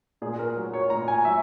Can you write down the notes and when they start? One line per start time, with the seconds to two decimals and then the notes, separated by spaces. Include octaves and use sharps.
0.22 A#2 G#4
0.39 A#4
0.56 F#3
0.74 C#5
0.90 A#2 A#5
1.08 G#5
1.25 F#3 E5